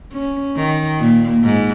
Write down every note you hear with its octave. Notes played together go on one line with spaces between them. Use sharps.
C#4
D#3
A#2
G#2